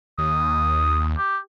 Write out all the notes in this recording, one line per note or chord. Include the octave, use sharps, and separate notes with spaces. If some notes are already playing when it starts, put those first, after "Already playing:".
D#2 D#6
G4